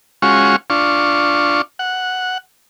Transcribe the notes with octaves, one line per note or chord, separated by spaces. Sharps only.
G#3 C#4 F4 F#4 C#6
D4 F4 C#6
F#5